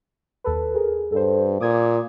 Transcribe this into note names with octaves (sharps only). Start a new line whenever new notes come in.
D#2 A4 B4
G#4 A#4
G2 A4 C5
A#2 D6 D#6 G#6